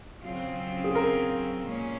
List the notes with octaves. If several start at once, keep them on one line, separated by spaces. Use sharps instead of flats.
C#3 F#3 C4 F4
G#4
A#4
A#2 G#3 C#4